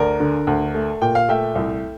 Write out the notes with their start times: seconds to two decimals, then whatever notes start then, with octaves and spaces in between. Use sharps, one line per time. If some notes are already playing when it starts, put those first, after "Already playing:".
Already playing: D2 A#4 D5
0.20 D3
0.47 D2
0.75 A3
1.02 A#2 G5
1.15 F5
1.29 A3 E5 G5
1.55 C2